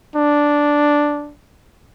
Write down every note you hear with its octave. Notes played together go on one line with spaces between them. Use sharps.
D4